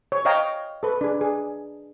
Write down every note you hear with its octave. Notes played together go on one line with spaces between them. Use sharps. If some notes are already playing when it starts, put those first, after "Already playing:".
C#5
C#5 D#5 F5 G5 A#5
A4 B4
D4 G#4
G#4